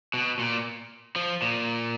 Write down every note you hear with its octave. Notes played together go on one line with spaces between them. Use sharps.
B2
A#2
F3
A#2